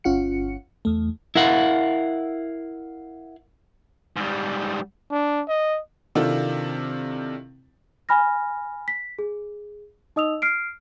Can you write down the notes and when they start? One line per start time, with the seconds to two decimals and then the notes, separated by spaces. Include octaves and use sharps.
0.04 G1 C#4 F4 F#5 C#7
0.85 E2 A3
1.36 E4 A#4 F5 F#5
4.16 G#2 G3
5.11 D4
5.48 D#5
6.15 C3 D#3 D4 E4 F4 A4
8.09 G#5 B5 F6 A#6
8.88 B6
9.19 G#4
10.16 D#4 D#5 D#6 E6 F7
10.42 F6 C7 D7